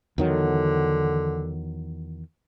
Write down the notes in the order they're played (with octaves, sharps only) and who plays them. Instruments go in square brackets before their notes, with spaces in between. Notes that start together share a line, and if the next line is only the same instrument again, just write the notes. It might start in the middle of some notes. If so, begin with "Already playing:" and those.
[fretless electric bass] E2 D#3 F#3 [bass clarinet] D3